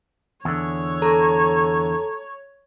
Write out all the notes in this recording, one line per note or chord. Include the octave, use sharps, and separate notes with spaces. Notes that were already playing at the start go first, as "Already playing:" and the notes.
E2 D3 C#5
A4 A#5